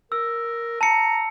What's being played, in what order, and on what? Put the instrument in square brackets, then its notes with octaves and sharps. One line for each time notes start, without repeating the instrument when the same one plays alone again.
[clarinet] A#4 [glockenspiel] E6
[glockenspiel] A5 C#7 [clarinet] A#5